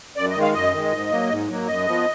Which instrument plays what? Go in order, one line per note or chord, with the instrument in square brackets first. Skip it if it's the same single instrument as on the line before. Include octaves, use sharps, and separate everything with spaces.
[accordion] F#2 D5
D#5
D#3 G#3
F5
F#2 D#5
D#3 G#3
G#2
F#3 A#3
G#2
F#3 A#3
F#2 D#5
F3 B3